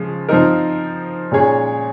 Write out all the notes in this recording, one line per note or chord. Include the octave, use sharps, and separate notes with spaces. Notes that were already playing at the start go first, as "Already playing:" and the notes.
Already playing: C#3 F3 G#3
F3 C4 D#4 A#4
A#2 G#3 C#4 G#4 C#5